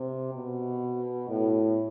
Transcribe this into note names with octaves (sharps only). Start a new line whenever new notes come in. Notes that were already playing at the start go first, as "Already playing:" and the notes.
Already playing: C3
B2
A2